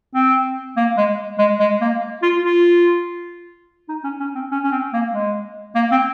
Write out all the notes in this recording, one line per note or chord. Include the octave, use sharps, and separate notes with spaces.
C4
A#3
G#3
G#3
G#3
A#3
F4
F4
D#4
C#4
C#4
C4
C#4
C#4
C4
A#3
G#3
A#3
C4